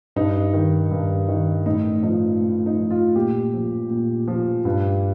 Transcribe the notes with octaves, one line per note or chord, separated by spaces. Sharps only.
G2 D#4
D#3
G2
D#3
A2 D#4
F3 D#4
A2
D#4
F3
F4
A#2 G4
F3
A#2
F3
G2